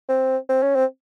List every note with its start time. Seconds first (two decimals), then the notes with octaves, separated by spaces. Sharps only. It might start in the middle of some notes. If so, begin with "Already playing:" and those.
0.09 C4
0.49 C4
0.63 C#4
0.75 C4